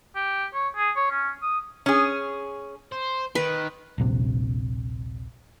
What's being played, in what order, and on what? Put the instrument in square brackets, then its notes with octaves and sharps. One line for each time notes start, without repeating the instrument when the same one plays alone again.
[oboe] G4
C#5
G#4
C#5
C#4
D#6
[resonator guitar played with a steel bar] C#4 G#4
[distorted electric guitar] C5
[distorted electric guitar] D#3 [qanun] B4
[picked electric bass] D#1 A#1 C3